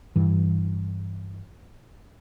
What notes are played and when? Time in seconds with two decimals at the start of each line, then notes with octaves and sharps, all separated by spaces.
0.16 G2 E3